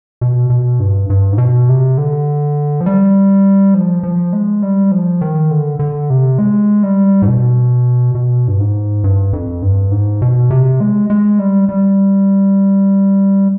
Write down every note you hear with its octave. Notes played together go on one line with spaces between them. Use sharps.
B2
B2
G2
G2
G#2
B2
C3
D3
F3
G3
F3
F3
G#3
G3
F3
D#3
D3
D3
C3
G#3
G3
G#2
B2
B2
G2
G#2
G2
F2
G2
G#2
B2
C3
G#3
G#3
G3
G3